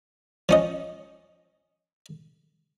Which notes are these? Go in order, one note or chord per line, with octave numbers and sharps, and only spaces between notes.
F3 C#4 D#5